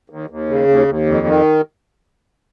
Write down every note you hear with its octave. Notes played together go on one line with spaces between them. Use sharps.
D#2
D#2
C#3
D#2
D#2
F2
D#3